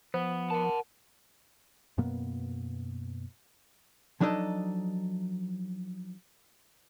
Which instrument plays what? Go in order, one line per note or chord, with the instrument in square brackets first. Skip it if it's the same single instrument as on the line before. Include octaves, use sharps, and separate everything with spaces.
[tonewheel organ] F3 [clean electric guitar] B3
[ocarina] A#4 [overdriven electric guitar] F#5 A5
[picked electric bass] F#2 B2 A#3 B3
[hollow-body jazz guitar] F3 F#3 D4 D#4 A4 D#5